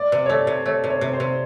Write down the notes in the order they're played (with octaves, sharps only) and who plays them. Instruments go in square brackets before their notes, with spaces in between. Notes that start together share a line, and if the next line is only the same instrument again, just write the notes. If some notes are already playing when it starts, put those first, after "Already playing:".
Already playing: [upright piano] D5
[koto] C3
[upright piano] C#5
[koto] A3 [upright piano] D5
[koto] C3
[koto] A3 [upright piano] C#5
[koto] C3
[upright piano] C#5
[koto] C3
[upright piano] C5
[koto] C3